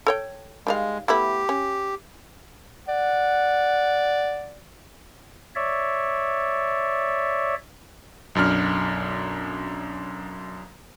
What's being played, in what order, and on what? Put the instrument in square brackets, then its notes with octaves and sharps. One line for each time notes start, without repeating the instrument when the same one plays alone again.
[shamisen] A4 C#5 G5
[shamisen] D#3 G3 F5 [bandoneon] G#3
[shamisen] A3 B3 E4 [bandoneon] G4
[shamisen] C#4
[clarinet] D5 [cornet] F#5
[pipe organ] C#5 D5 E5
[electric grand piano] B1 F#2 D4 F6